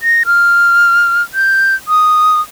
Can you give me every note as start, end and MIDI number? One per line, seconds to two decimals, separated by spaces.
0.01 0.24 94
0.26 1.23 89
1.34 1.75 91
1.88 2.41 87